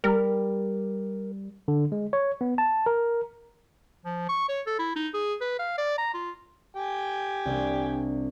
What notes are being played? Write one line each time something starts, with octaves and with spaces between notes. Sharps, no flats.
G3 A#4
D3
G#3
C#5
B3
A5
A#4
F3
C#6
C#5
A4
E4
D#4
G#4
B4
F5
D5
A#5
F4
G4 G5 G#5
C2 A#3 D4